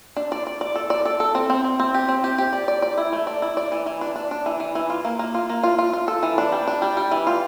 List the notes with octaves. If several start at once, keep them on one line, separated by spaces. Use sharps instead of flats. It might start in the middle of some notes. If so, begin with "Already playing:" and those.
D4
D5
D5
D5
A4
D5
A4
A4
C4
C4
C4
C4
G4
C4
G4
G4
D5
D5
D5
E4
A3
D5
E4
D5
E3
E3
D4
D4
D4
E3
E3
E3
F4
A#3
A#3
F4
A#3
F4
F4
F4
A4
E3
D4
G3
D4
G3
G3
E3
F4